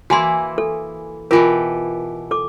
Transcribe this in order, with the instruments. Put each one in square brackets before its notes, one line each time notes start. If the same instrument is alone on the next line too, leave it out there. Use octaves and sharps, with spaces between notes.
[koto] E3 A#3 E4 [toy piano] F#4 G#5 C6
[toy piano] A4
[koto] B2 E3 G4 [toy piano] F4 A#4
[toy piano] A4 D6